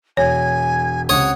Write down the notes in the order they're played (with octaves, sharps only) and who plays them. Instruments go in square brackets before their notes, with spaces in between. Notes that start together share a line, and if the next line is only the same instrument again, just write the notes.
[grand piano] E1 [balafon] C#5 [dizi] G#5
[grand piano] C#2 C3 [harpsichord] C#5 D#6 [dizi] F#5